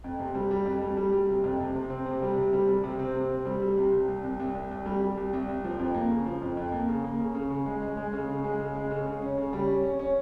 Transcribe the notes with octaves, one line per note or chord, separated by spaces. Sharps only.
F2
C3
G3
G3
F2
G3
G3
G3
C3
F2
C3
C3
C4
C3
G3
C3
G3
G3
C3
C4
C3
C4
G3
G3
C3
C2
C2
C2
C2
C2
C2
G3
G3
C2
C2
C2
F3
F2
A#3
C#3
F3
F2
F2
A#3
C#3
A#3
C#3
C#3
C#3
G#3
G#3
G#3
C#3
C#3
G#3
C#3
G#3
C#3
C#3
C#4
C#3
G3
C#4
C#4
C#4